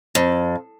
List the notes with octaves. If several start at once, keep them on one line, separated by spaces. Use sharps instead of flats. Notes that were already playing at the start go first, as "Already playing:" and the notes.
F2